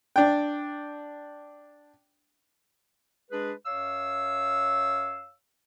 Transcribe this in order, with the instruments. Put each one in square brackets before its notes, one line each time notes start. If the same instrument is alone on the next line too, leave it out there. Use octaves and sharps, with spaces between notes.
[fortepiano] D4 G5
[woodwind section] G#3 D4 G#4 B4
F#2 C#5 F5 E6